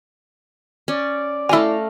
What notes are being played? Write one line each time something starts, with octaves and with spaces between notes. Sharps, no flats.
C#4 D5
A3 E4 F5 G#5 A#5